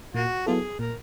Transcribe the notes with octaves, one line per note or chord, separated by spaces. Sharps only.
A#2 A#3 F#4
F#3 B3 E4 F4 G#4 A4
A#2 A#4